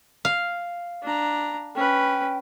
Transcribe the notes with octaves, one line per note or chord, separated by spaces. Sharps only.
F5
D4 A#5
C#4 B4 G5